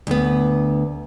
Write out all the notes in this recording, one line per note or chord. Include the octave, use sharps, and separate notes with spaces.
D2 B3